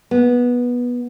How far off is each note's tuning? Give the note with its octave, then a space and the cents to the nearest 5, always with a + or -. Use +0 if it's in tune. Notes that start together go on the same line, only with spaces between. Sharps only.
B3 -15